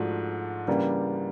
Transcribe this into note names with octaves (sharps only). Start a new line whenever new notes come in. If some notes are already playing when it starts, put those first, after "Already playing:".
Already playing: G#2 F3 A3 D4 F#4
C#3 E3 G3 A#3 D4